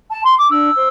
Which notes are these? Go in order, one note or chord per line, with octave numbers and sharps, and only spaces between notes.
A5
C6
D6
D4 E6
C5